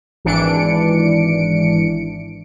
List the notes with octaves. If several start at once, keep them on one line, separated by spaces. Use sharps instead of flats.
G#1 E3 D4 C#7 D7